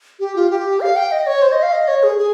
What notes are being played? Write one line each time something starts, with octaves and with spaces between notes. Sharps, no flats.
G4
F4
G4
F5
G5
D#5
C#5
C5
D#5
F5
D#5
C#5
G#4
G#4